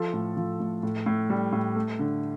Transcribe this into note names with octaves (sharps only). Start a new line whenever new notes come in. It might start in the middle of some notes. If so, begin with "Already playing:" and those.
Already playing: F3 A4
A2
F3
A2
A2
A2
G3
A2
A3
D3